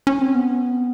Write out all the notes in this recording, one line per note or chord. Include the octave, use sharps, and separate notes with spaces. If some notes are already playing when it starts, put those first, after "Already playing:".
C#4
C4
B3